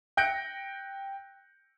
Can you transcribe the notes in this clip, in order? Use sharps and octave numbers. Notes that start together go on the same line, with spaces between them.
G5 F#6 G6 A#6 C#7 D7